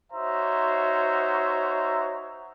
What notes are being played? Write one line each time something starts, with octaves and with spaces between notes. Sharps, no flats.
D#4 F#4 C5 C#5 E5 A#5